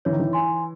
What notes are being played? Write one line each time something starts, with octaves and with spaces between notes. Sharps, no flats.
E3 C#5
D#3
E3
G#5 C6